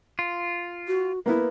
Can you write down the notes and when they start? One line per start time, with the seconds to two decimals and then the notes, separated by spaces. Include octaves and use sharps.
0.19 F4
0.88 F#4
1.26 A#3 B3 E4 B4